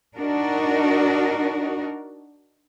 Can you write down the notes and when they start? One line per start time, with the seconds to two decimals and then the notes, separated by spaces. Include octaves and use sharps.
0.16 D4 D#4 F#4 A#4